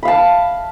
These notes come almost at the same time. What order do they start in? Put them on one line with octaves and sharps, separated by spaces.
B5 F5 A5